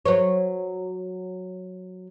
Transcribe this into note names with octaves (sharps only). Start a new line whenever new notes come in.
F#3 C5 C#5